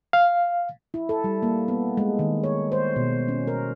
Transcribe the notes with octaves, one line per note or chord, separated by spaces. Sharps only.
F5
E4
A4
G3
A#3
B3
G#3
D#3
C#5
C5
B2
C#4
A#4